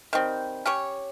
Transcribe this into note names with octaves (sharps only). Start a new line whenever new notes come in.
D#3 G3 C4
C#4 G4 C#5